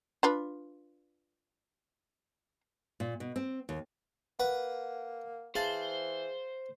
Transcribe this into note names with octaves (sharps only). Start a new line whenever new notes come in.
D4 F4 B4
A#2
B2
C4
D#2
A#3 B4 F#5
E3 G#4 C5 F5 A5